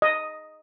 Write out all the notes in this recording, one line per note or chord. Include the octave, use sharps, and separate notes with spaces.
D#5